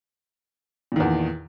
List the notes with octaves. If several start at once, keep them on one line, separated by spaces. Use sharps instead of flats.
E2 A#2 D#3